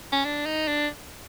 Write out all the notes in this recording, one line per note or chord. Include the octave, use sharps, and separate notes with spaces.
C#4
D4
D#4
D4